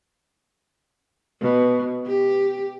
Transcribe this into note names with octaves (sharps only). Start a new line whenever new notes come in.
B2
G4